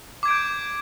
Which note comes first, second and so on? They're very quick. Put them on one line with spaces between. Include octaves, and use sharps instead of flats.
D6 G#6 D7 G6